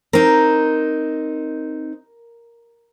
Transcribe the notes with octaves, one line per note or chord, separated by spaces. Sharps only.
C4 D#4 A#4